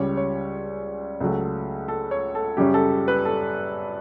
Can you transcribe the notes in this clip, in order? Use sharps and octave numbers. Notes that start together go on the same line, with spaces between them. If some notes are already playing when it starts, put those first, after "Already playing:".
Already playing: C#2 C#3 G3 C#5
C#5
C#2 C#3 F#3 A3
A4
C#5
A4
F#2 C#3 G3 C#4 G4
A4
B4
A4